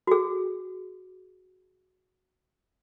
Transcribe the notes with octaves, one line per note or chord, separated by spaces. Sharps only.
F#4 G#4